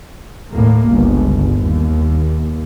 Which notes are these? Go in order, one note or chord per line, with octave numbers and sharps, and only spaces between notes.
D#2 A2 A#3
G1 C#2
D#2